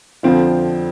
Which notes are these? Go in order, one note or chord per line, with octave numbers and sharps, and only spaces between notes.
F2 D3 F3 C4 F4